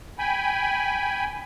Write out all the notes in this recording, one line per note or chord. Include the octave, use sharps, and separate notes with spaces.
G5 G#5 B5